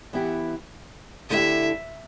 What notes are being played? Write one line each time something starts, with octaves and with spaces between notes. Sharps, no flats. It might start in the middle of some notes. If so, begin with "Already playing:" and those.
E3 B3 E4 G4
D3 A3 E4 G4 E5